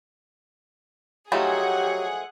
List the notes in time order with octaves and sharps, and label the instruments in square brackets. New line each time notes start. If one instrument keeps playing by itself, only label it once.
[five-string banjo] F3 A3 D#4 [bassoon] F#3 [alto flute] G4 [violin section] G#4 F#5